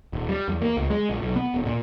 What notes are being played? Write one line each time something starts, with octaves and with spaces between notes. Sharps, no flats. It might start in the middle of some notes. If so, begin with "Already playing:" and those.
D#1
G3
E2
A#3
C#2
G#3
A#1
B1
B3
D#1
A#2